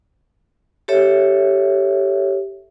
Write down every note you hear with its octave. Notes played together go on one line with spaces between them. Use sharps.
G4 A4 C#5 E5